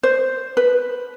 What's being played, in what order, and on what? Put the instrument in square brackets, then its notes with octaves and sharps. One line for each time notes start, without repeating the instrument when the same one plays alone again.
[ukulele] C5
B4